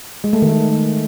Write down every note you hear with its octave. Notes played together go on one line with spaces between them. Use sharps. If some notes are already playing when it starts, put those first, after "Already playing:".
G#3
A3
D#3